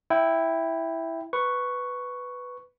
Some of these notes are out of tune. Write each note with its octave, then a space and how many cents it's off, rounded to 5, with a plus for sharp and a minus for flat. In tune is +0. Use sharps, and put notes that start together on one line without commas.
E4 +0 G5 +5
B4 +5 C#6 +0